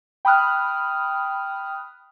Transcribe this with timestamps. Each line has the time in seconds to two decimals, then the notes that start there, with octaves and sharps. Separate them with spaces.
0.25 G5 B5 D#6 F6 F#6